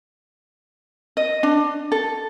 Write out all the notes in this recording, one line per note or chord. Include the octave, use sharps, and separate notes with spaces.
D#5
D4
A4